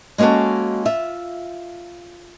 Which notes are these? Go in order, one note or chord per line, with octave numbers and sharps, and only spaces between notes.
G#3 A#3 C#4 F#4 A4
F4 E5